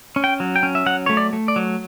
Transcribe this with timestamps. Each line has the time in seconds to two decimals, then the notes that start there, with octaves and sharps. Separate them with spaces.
0.16 C#4
0.24 G5
0.40 F#3
0.56 G5
0.63 C#4
0.75 E5
0.86 F#3 F#5
1.06 A3 C#5
1.17 D5
1.33 A3
1.48 D5
1.56 F#3